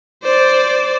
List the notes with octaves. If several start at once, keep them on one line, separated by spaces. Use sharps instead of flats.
C5 D5